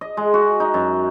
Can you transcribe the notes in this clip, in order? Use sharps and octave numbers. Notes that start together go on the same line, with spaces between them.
D#5
G#3
F#4
D#4
F#2